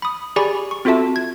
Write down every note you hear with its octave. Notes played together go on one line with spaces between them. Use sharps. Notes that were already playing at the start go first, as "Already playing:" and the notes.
B5 D#6
G4 G#4 D5 G#5 B5 C#6
C#6
C4 F4 F#4 A4 E5 A5
G#6